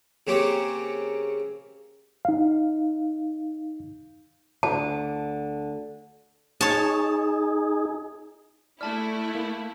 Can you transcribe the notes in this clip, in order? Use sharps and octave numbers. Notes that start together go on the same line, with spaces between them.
C#3 A#3 C4 C#4 G4
D#4 F5
D2 D3 A5
D#4 G#4 C#5 A5
A3 E4 D5 A5 F6
A#3